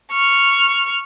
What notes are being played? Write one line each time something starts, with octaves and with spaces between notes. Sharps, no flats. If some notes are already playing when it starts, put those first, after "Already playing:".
C#6 F6